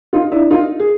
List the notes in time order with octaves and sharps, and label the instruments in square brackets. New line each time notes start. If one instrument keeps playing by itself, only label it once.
[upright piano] D#4 F4
D4 E4
D#4 F4
G#4